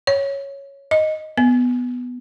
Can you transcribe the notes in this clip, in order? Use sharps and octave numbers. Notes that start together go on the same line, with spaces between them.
C#5
D#5
B3